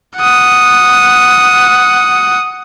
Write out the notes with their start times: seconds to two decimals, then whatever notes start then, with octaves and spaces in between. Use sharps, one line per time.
0.17 F#5 D#6